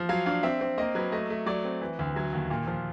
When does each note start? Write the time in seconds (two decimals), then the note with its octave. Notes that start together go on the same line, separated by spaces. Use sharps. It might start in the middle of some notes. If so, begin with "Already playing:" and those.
Already playing: F3
0.09 F#3 F5
0.26 D4 F5
0.43 C4 E5
0.61 C4
0.78 A#3 D#5
0.95 F#3 B4
1.12 A3 D#5
1.30 A3
1.46 F#3 D5
1.64 C4
1.81 E3
1.99 D2
2.16 F#3
2.33 D#2
2.50 A#2
2.67 F3